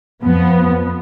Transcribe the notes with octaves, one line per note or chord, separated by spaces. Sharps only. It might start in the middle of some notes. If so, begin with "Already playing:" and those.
F2 F3 B3